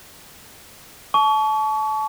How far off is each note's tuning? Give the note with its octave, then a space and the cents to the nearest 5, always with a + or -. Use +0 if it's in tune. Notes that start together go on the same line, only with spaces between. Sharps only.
A5 -30 C#6 +30